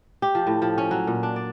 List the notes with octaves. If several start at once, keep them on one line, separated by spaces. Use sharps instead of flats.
G4
F3
A2
F3
C#4
F#3
A#2
D4
D5